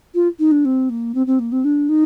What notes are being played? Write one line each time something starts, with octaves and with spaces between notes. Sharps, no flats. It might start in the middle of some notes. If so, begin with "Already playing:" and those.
F4
D#4
D4
C4
A#3
C4
C4
A#3
C4
D4
D#4